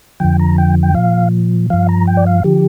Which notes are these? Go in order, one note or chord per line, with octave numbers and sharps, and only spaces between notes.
F2 D3 F3 G5
A#5
G5
G5
A#2 F3 F5
G2 F3 F5
A#5
G5
D5
F5
D3 F3 G4